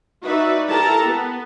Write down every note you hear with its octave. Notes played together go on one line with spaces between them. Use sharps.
D#4 F#4 B4 D5 E5
E4 G4 A4 A#4 A5 A#5
B3